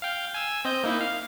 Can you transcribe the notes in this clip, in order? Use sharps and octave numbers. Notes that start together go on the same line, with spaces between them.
F5 G5
G#5 E6
C4 D#5 G6
A#3 D#4 E4
F5